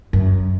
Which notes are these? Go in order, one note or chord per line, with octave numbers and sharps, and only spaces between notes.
F#2